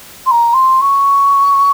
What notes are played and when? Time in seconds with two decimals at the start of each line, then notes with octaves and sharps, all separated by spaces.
0.26 C6
0.30 A#5
0.53 C6
0.81 C#6